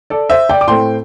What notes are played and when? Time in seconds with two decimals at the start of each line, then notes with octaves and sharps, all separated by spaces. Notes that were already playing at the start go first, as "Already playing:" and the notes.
0.10 A4 D5
0.30 C5 E5
0.49 D5 G5
0.61 D6
0.67 A2 A3 C4 G5 C6